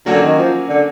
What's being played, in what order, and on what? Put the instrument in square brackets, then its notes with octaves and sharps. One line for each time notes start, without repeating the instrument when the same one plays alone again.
[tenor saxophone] D3 [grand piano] F#3 A#3 C#4 F#4
[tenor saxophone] D#3
F3
D3